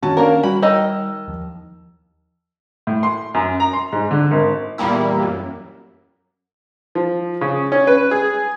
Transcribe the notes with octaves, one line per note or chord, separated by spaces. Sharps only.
D#3 C#4 F#4 A5
A#3 D4 A#4
G3 F#4 B5
D#3 D#4 D#5 E6
D#2 F3
A2
C6
F#2
A#5
C6
G#2
D3
G#1
E2 A#2 G3 A#3 E4
F#2
F3
C#3
C#4
B4
G#4